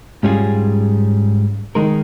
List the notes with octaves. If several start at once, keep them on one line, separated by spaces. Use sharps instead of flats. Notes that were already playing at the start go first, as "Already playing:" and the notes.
G#2 G3 C#4 F4 G#4
D#3 G#3 D#4 A#4